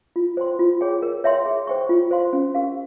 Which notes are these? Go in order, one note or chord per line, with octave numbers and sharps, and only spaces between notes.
F4
C5 G5 C6
F4
G#4 C#5 G5
A#4
C#5 E5 G5 C6
G#4
C5 G5 C#6
F4
C5 F5 C6
C#4
G4 A#4 F5